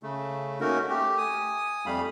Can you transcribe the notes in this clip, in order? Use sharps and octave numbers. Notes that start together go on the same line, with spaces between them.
C#3 A3
A3 A#3 C#4 D#4 F#4 A#4
A3 G4
G#5 D#6
F2 G3 A3 F5 B5